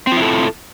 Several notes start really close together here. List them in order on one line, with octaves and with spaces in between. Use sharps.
C4 F4 E4 A4